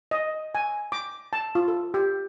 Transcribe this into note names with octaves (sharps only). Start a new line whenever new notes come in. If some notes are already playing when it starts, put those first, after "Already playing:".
D#5
G#5
D6
A5
F4
A4
G4